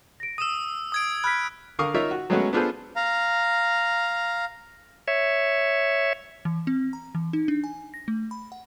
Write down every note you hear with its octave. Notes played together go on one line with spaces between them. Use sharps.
A#6 D7
D#6 E6 D#7 E7
D#6 G#6 D7
B5 F6 F#6 B6
D3 A#4 F5 C#6 D#6
D#4 F4 A#4 C#5 E5
F#4
F#3 G#3 A3 B3 C#4 F#4
B3 D4 F4 G#4 A4 C5
F5 A#5
C#5 E5
E3
C4
A#5
E3
D#4
D4
G#5
A#6
A3
B5
F#5